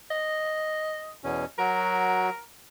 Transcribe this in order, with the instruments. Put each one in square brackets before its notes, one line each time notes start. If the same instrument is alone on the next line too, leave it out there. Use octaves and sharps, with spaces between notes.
[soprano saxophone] D#5
[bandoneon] E2 B2 C#4
[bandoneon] F#3 F#4 [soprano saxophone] A#4